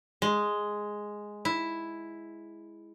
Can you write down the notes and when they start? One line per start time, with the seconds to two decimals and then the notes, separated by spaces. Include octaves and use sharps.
0.22 G#3
1.45 E4